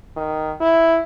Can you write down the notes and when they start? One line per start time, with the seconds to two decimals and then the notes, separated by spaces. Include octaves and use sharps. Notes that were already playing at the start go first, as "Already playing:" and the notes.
0.16 D#3
0.61 E4